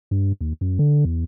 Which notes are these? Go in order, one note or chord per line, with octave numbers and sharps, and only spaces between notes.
G2
D#2
F#2
D3
E2